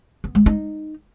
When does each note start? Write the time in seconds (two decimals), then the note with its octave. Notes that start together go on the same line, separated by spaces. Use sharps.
0.24 B3
0.35 G#3
0.46 D#4